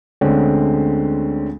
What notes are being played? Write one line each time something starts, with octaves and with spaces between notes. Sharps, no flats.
D2 D3 G#3 C4 C#4